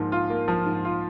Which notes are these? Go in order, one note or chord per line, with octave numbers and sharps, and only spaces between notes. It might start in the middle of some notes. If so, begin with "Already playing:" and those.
Already playing: G#2 F3 A#3 F4
F4
A#3
F3
G#2
F4